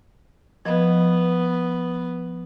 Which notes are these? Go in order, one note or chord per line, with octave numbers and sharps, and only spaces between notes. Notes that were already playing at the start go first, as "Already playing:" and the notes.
F3 B3 D#5